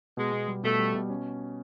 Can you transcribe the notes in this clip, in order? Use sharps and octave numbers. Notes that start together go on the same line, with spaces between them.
B2 G#3
B2
G3
B2 A3
G3
B2
C#4